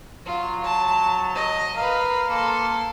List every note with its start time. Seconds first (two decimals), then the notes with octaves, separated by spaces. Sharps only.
0.25 F#3 F4
0.64 A5
1.35 D#5
1.76 A#4 B4 F5
2.29 A#3 A4 C6